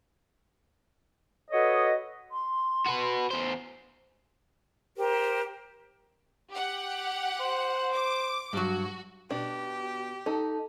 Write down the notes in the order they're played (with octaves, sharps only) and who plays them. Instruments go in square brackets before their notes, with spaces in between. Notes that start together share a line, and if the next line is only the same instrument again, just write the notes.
[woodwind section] F#4 A4 B4 C#5 D#5
[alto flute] C6
[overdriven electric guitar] F#4 B4
E2 C5
[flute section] G4 A#4 C5
[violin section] G4 F#5
[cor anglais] C5
[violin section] D6
[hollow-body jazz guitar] G2 F#3 [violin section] F#4
[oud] B2 [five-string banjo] D4 [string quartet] G4
[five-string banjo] D#4 [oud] A4